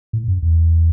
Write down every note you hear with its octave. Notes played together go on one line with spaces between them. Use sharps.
A2
F#2
E2